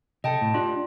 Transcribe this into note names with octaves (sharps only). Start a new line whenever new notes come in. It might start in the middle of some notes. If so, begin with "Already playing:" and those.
C3 A4 D#5 G5 A5
A2
D4 F4 G4 D5